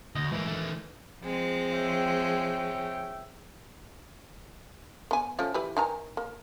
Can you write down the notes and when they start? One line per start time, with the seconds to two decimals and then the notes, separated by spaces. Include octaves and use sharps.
0.15 D2 D#5
0.32 G#2 E3 A#3
0.47 D#3 A3
1.21 F3 G#3 C4
1.73 C#5 E5 G5
5.11 B3 G#5
5.39 F3 A3 C#4
5.54 E3 G4 B4
5.77 D#3 G#5 A#5
6.17 A#3